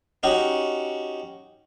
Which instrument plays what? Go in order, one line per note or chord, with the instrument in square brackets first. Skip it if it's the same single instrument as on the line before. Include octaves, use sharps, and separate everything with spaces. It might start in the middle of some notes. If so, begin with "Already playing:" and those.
[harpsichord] C#4 D#4 F#4 G4